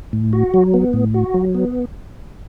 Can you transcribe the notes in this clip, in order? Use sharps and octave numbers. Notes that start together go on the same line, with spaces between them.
A2
F#4
F#3
B3
A2
F#4
F#3
B3